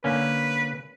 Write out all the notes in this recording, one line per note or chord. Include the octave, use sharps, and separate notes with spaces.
D3 A#3 C#4 B4